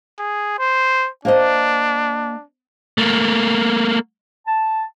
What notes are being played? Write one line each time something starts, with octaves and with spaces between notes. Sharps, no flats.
G#4
C5
A#3 D4 C5 D#5
A3 A#3
A5